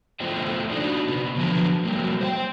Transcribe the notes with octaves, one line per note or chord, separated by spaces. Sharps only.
A3 B3 F4 C5 D#5 G5
D4 D#4 F#4
C3 B3
D3 F3 F#3 B4 A5 A#5
F#3 G3 A#3
C5 F5 G5